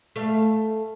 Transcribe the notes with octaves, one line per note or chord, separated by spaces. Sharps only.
A3 F5